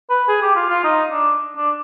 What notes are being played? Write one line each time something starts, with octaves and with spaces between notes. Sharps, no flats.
B4
G#4
G4
F4
F4
D#4
D4
D4